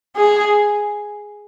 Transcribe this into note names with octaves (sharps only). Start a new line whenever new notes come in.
G#4